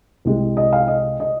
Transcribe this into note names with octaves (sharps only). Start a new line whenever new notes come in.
C2 C3 G#3
D#5
F5
D#5
D#5